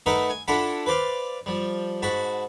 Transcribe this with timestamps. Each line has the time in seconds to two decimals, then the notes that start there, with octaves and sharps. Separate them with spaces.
0.06 A3 D#4 A#4 B4 E5 F#5
0.30 G#5
0.48 D4 E4 F4 A4 F#5 B5
0.86 B4 C5 D5 F5
1.46 F3 G3
2.02 G#2 F#4 A5 B5